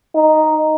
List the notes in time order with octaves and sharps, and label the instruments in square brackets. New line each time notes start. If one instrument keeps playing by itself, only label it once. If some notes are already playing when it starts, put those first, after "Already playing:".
[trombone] D#4